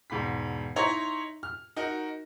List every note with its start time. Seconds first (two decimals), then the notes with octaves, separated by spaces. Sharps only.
0.10 E1 G#2 B5 B6
0.76 D#4 E4 C#5 A#5 C6
1.43 F6
1.76 D#4 F#4 A#4